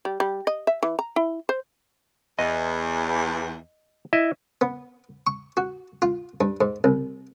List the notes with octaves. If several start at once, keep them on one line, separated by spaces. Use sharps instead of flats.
G3
G3
D#5
E5
E3
A#5
E4
C5
E2 D#5
E4 D#5 E5
B3
C#6
F#4
F4
G2
G#2
C2